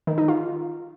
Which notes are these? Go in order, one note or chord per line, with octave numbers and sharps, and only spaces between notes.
D#3
D#4
F4